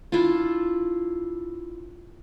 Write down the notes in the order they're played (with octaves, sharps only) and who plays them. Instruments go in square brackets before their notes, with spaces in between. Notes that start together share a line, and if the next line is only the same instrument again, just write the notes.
[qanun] D4 E4 F4